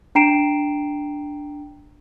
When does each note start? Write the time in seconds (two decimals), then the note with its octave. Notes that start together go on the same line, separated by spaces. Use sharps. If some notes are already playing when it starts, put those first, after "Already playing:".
0.15 D4 G5 A#5 C7 D7 E7